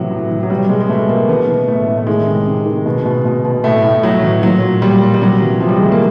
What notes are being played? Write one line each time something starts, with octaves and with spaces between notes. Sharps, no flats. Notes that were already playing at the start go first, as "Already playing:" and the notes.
Already playing: A2 C3 E3 F#3
A2
E3
F#3
B2 G3
B2 G#3
G#3
B2 A3
B2 A#3
E3 B3
E3
A2 A3
A2
A3
D#3 G#3
C3
C3
D#3
B2
B2
B2
B2
A2 A3
A2
A2 F#3
E3
A#2 F#3
A#2
A#2 G3
A#2
G3
C3 F#3
E3
C3 F3
G3
G#3
E3 A3
A#3